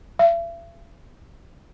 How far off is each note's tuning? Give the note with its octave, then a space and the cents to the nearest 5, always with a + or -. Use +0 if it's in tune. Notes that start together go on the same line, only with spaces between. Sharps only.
E5 +45